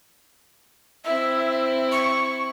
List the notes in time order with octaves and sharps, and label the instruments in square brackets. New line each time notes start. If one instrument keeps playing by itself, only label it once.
[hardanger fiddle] C4 E4 [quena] E5
[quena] C#6